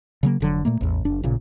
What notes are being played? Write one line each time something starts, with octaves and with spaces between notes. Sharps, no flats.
C#3 F#3 A#3
F1 D3 F#3
A#2 A3 A#3
A1 E2
F#1 D4
A1 A#2 C#3